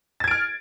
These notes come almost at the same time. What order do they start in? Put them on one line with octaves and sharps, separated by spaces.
A6 G#6 D7 F6